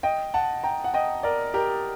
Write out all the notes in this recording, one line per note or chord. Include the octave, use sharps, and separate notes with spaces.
D#5 G5
F#5 A5
G5 A#5
F#5
D#5 G5
A#4 D5
G4 A#4